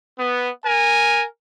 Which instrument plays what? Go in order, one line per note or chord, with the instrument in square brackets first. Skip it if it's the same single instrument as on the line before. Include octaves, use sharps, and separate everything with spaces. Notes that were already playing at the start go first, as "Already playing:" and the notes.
[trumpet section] B3
A#4 G#5